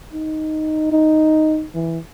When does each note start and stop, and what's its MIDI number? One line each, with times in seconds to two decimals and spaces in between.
0.13 0.91 63
0.92 1.65 63
1.75 1.98 52